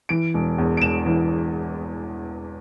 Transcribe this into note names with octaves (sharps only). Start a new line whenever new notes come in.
E3 D7
E1
E2
D7
E1 E7
E3